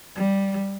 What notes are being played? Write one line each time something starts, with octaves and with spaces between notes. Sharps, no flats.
G3